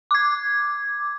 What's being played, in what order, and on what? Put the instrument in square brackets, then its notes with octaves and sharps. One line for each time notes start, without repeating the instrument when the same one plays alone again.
[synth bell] D6 G#6